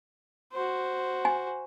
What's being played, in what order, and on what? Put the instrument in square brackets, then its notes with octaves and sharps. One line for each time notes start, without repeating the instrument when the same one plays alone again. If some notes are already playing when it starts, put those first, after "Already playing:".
[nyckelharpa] F#4 C5
[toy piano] G#5